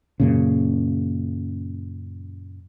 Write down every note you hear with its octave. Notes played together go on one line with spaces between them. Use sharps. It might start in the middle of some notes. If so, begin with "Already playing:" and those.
F#2 A#2 C#3